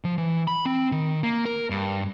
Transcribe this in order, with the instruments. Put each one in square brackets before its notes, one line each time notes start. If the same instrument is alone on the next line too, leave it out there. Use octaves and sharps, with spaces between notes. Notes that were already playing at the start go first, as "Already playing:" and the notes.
[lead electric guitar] F3
E3
B5
C4
D#3
A#3
A#4
G2